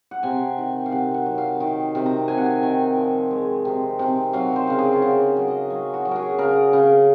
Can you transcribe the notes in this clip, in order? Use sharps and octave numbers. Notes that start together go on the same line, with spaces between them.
F#5
C3 G#5
D#3
F5
C3 F#5
F#5
F#3
F5
D#3
C3
A#5
C3 G#5
F#5
G#5
D#3
F3
G#3
C3
C3
F#3 F5
C5
C#3 A#4
G#4
F4
C#3 F#4
F#3
D#5
F#3 C#5
F#4
F#3
G#4 A#4
C#3 A#4
C#3